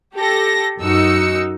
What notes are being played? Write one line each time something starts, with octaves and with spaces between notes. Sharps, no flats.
G4 A4 A#6
F#2 D#4 F#4 E6 C#7